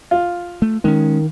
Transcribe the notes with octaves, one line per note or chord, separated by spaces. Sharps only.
F4
A3
D#3 G#3 C#4